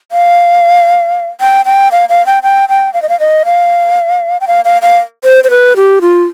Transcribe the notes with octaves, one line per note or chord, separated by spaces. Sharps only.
F5
G5
G5
F5
F5
G5
G5
G5
F5
D#5
F5
D#5
F5
G5
F5
F5
F5
C5
C5
B4
G4
F4